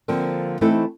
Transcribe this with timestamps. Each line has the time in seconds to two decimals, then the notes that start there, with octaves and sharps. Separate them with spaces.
0.08 D3 F3 A#3 C4 D4
0.61 E3 A3 C4 D#4 E4 A4